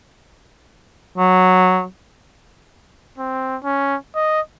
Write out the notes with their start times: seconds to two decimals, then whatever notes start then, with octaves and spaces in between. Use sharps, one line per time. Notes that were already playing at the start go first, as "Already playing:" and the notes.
1.18 F#3
3.18 C4
3.64 C#4
4.15 D#5